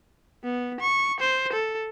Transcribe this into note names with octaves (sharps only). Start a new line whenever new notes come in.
B3
C#6
C5
A4